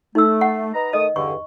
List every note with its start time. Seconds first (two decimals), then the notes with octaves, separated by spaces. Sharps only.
0.15 A3 D#4 E6
0.41 F#5
0.74 B4 D#5 A#5
0.93 D#3 A3 D#5 D#6
1.16 E2 G2 D3 C#6